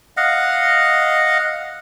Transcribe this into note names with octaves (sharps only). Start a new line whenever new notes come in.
D#5 F5 F#5